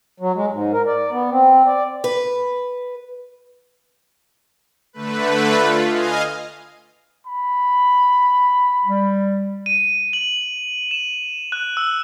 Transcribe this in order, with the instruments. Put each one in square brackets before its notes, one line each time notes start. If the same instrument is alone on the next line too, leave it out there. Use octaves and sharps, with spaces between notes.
[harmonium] F#3
G#3
G#2
A#4
D5
B3
C4
D5
[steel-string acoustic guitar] B4
[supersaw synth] D3 A3 B4
F4
D#5 F5 G#5
[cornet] B5
[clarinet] G3
[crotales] D#7
F#7
E7
F#6
E6